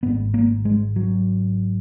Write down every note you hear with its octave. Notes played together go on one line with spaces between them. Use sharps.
G#1 G#2 B3
A#3
G#3
F#3